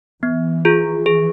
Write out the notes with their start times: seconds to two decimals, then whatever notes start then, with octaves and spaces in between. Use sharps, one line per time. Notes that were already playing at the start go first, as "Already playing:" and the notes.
0.22 E3 B3
0.65 F4 G#4
1.06 G#4